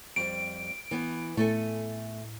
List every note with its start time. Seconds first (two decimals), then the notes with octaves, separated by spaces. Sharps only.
0.16 F2 G3 D7
0.91 E3 B3
1.37 A2 A3 A4 G#5